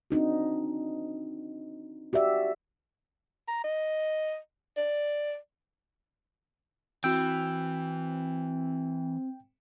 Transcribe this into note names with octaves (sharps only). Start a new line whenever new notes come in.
C4 D4 D#4 F#4
F#4 G4 D5 E5
A#5
D#5
D5
E3 C4 F#4 G5 E6